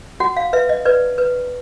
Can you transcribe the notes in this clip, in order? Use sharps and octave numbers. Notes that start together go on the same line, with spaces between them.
F#4 F#5
F5
B4 E5
D#5
B4 D5
B4